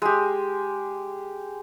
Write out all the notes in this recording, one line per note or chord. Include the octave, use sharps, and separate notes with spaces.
G#3 G4